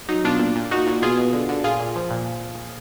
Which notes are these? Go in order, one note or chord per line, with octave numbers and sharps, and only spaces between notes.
F#3 D#4
B2 D4 F4
A#2
A#2
A#2 D#4 F#4
A#2
B2 F4 G#4
B2
D3
D3
A#2 F4 G#4
A#2
F3
A#2